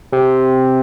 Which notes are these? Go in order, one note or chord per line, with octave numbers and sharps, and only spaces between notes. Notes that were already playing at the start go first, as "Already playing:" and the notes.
C3